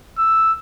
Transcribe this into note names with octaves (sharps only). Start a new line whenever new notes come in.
E6